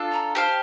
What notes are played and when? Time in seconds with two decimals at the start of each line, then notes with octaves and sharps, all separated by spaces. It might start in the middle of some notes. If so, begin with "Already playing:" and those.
Already playing: D4 F4 A4
0.13 A#5
0.35 G4 C5 F5 A5